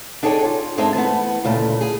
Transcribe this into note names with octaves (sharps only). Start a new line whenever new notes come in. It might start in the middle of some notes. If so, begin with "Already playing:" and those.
D4 D#4 G#4 A4 C#5 G5
F4
G2 G#3 C4 D#4 E5 A5
E3 A3 B3
D2 A#2 C#3 A3
G#4